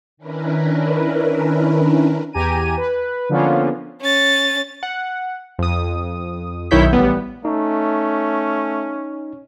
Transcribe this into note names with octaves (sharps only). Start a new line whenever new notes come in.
D#3 C#4 D4 E4 A#4 B4
E2 G4 G#5 A#5 D#7
B4
D3 F3 A#3 B3 C#4 F4
C#4 A6
F#5
F2 D#6
B1 D#3 E4 C#5 G6 B6
A1 G3 B3
A3 C#4 D#4